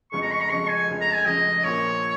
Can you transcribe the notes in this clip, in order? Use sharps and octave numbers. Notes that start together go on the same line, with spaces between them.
F1 F2 C#3 G#3 C#6
A#5
C#6
A#5
F1 F2 C#3 G#3 C#6
G#5
F1 F2 C#3 G#3
A#5
G#5
F1 F2 C#3 G#3 D#5
A#1 A#2 F3 A#3 C#5